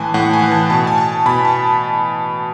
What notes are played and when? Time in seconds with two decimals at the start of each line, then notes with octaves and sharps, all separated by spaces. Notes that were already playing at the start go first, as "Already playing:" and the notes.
Already playing: A2 E3 G#5 A5
0.14 A2 F#5
0.33 G#5
0.42 E3
0.52 A5
0.70 B2 A5
0.87 G#5
0.98 A5
1.26 B2 B5
1.45 A5